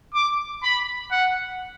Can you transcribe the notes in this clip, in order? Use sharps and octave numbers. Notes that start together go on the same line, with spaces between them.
D6
B5
F#5